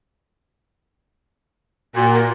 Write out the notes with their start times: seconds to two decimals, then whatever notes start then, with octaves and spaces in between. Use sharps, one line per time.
1.95 A#2 F#4
2.15 A#4